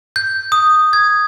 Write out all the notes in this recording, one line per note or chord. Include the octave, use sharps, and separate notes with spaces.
G6
D#6
G#6